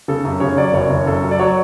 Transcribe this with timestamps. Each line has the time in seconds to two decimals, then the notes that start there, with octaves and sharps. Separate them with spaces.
0.08 C#3 A4
0.25 F#2
0.40 C#3 C#5
0.57 F#3 D5
0.73 F#1 C#5
0.90 F#1
1.06 F#2 A4
1.23 F#3
1.31 D5
1.39 F#3 C#5